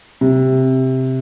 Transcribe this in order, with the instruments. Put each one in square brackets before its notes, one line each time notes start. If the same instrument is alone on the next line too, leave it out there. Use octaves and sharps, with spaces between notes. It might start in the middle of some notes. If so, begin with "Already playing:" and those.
[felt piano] C3